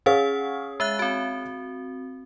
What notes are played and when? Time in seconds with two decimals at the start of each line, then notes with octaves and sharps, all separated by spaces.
0.06 C#4 G#4 C#5 F5 F#5
0.80 G#3 E5 F#6
0.99 C4 F#4